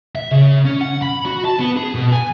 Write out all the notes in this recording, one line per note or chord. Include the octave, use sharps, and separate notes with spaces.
E5
C#3
C#4
F#5
B5
F#4
A5
B3
G#4
B2
G#5